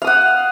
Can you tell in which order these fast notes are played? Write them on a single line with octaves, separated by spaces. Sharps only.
F5 D#6 F#5